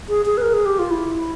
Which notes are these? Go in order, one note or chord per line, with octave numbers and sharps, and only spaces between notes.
G#4
G#4
B4
A#4
G#4
G4
F4
E4